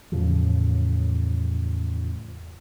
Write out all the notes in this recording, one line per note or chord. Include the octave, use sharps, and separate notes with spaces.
E2 A2 C#3 F3